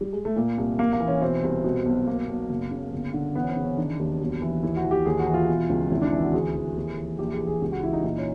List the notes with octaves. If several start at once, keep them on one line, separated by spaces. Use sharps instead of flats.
G3
G#3
A3
A#2 A#3
C2
A#1 A#3
A#3
E3
C#4
B2 C4
C2
B2
B1
B2 A#3
B1
F#1
C#3
G1
D3
E3 B3
C#4
C4
C#3
C#4
D#3 D4
D#2
B1
E3
D#2 E4
F#4
E3
G4
D#2 G#4
F#4
E3
F4
B2
C#2
G#1 E4
D4
E3 E4
F#4
D2 G#4
E3
D#2
E3
A#1 G4
G#4
E3
G#4
C#2 G4
F#4
E3 E4
D#4
A#2 D#4
C#4